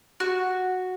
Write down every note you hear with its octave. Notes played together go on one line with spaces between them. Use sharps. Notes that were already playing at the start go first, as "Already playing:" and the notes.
F#4